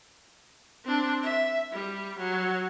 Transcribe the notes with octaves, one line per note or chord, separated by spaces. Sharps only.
C4 D4
E5
G3
F#3